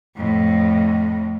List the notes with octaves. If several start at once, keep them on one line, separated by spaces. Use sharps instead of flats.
F2 A2